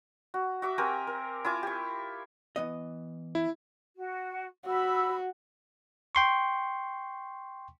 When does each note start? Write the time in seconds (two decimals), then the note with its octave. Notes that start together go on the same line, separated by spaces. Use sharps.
0.34 F#4
0.62 F#4 E5 D6
0.78 C4 G4 A#4 G#5
1.07 A#4
1.44 E4 F4 G#5 D6
1.63 G4 C#6
2.56 E3 B3 D#5
3.35 E4
3.96 F#4
4.67 F#4 B5 E6
6.15 G5 C6 C#6